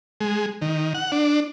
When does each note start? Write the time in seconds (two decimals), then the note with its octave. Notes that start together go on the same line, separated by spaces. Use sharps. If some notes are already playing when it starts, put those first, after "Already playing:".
0.21 G#3
0.61 D#3
0.95 F#5
1.12 D4